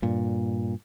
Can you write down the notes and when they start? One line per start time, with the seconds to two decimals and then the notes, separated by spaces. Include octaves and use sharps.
0.02 G2 A#2